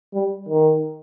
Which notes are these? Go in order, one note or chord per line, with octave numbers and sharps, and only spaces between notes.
G3
D#3